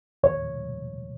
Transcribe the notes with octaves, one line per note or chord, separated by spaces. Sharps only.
D#2 C#5